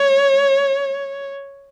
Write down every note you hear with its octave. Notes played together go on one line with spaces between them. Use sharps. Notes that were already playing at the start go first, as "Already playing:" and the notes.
Already playing: C#5